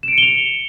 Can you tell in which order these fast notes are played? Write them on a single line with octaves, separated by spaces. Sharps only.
E7 D7 C#7 G7 F7